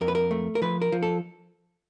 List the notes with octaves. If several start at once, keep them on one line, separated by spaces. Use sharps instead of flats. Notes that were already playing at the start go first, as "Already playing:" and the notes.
F2 A#4
B4
A#4
A3
A#4
F3 B4
A#4
F3
A4